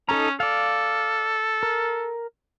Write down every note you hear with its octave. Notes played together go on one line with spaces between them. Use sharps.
C#4 D#4 A4 A#5
A4 D5 F5
A#4